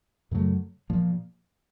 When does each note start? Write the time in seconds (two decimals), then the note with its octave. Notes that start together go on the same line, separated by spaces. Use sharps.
0.31 F#2 C#3 F#3 A3
0.90 A#2 F3 A#3